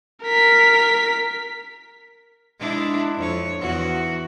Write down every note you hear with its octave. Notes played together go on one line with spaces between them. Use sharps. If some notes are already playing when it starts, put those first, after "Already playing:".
A#4 B6
G#3 D4 E4
F2 C#5
E2 F#4